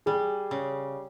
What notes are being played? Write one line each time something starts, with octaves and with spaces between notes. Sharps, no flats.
G3 G#4
C#3